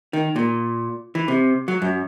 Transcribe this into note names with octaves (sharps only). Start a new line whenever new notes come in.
D#3
A#2
E3
C3
F#3
F#2